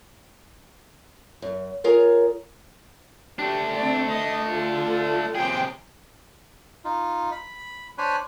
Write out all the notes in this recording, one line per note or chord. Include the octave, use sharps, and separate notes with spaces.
F#2
F4 G#4 A#4 C#5
A3 D4 G4
C4 D5
D#5
F4 A4
C3 G#4 G5
D#4 F4
B5
D4 C5 C#5 G#5 B5 F#6